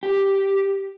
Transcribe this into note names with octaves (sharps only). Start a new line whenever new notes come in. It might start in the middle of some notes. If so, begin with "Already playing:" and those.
G4